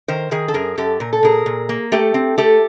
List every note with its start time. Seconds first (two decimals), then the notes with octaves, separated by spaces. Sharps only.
0.08 D#3 A#4 C5
0.31 D#3 G#4 A#4
0.48 A4
0.54 F#2 G#4 A#4
0.78 F#2 G4 A4
1.00 A#2 A#4
1.13 A4
1.23 A#2 G#4 A#4
1.46 A#2
1.69 A#3
1.92 A3 G4 A4
2.14 C4
2.38 A3 G4 A4